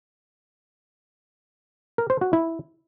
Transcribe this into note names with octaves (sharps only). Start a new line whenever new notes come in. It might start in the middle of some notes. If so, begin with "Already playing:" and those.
A#4
C5
F#4
E4